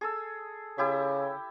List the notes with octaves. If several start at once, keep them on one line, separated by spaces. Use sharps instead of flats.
G#4 A4 E6
C#3 E4 G4 E5